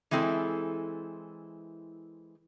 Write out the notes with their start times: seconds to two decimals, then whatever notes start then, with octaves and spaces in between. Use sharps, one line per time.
0.11 E3 G#3 C4 E4 A4